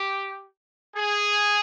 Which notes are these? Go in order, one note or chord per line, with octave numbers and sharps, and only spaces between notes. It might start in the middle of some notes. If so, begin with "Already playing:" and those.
Already playing: G4
G#4